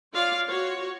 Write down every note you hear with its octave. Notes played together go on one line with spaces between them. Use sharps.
F4 C#5 D5 F5
F#4 C#5